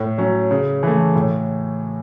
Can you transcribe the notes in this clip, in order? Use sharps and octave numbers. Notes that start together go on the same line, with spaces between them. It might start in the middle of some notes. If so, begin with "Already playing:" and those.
Already playing: A2
F#3 C#4
C#3
E3 A3
A2